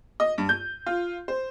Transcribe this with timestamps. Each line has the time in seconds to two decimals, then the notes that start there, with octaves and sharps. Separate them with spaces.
0.20 D#5
0.38 G2
0.49 G6
0.86 F4
1.28 C5